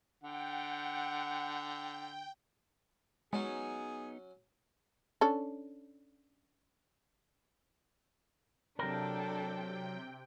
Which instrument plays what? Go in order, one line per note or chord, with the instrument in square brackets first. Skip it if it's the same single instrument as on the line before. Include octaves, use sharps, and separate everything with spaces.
[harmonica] D3 [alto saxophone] F#5 [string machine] G5
[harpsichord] F#3 C#4 [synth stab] G#3 [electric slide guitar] B3 D#4 [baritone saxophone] G#4
[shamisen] C#4 D4 A4
[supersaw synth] C3 G5 [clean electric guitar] F#3 A#4 [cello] D4 A4